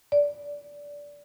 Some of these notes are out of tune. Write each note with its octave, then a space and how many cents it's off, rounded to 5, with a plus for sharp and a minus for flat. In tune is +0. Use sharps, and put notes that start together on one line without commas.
D5 -20